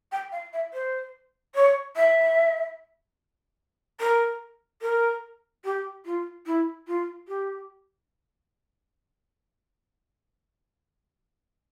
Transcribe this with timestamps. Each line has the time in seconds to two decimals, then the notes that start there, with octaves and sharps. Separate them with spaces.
0.12 G5
0.32 F5
0.53 E5
0.73 C5
1.55 C#5
1.96 E5
4.00 A#4
4.82 A#4
5.65 G4
6.05 F4
6.46 E4
6.88 F4
7.28 G4